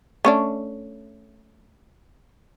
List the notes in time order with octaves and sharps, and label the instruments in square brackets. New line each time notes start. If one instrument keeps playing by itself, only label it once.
[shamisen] A3 C#4 D4